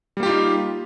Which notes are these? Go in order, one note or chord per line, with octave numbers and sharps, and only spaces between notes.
G3 A#3 D#4 F4 G4